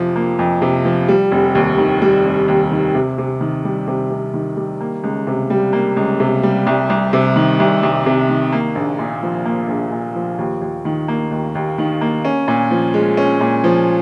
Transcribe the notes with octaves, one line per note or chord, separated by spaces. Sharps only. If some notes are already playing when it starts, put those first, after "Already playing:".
Already playing: F2 C3 F3
A#3
F2
C3
F3
G3
F1
D#2
D#3
G3
F1
D#2
D#3
C3
C3
D#3
G3
C3
C3
D#3
G3
A#3
C#2
C3
G3
A#3
C#2
C3
G3
C2
C2
C3
D#3
C2
C2
C3
D#3
A#3
A#1
A#2
F3
A#3
A#1
A#2
F3
D#2
D#2
D#3
A#3
D#2
D#2
D#3
A#3
C#4
A#2
F3
G#3
C#4
A#2
F3